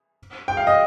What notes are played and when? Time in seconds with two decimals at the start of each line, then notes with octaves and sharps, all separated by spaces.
0.48 G5
0.57 F5
0.67 D#5